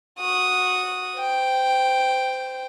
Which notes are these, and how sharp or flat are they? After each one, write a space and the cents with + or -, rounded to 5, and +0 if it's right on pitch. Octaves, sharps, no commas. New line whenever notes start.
F#4 -10 D#6 +0
C5 -25 G5 +0